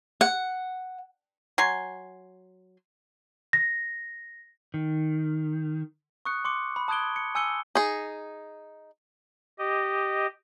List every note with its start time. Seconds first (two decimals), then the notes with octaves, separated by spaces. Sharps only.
0.21 F#5
1.58 F#3 G#5 C6
3.53 A#6
4.74 D#3
6.25 C#6 D#6 F#6 C#7
6.45 C6 D6 C#7
6.76 B5
6.88 A5 D#6 F#6 G#6 D7 G7
7.16 C#7
7.35 G#5 E6 G6 C#7 G7
7.75 D#4 G#4
9.59 G4 D#5